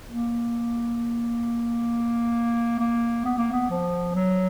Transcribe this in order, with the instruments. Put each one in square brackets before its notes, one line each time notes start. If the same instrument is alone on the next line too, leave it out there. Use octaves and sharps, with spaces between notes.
[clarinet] A#3
A#3
B3
A#3
B3
F3
F#3